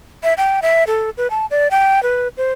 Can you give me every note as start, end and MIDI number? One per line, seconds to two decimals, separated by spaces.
0.23 0.34 76
0.38 0.60 79
0.62 0.84 76
0.87 1.10 69
1.17 1.28 71
1.31 1.46 81
1.51 1.68 74
1.71 2.03 79
2.03 2.28 71
2.37 2.52 72